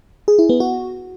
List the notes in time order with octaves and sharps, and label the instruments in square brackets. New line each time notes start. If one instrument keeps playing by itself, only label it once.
[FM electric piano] G#4
E4
B3
F#4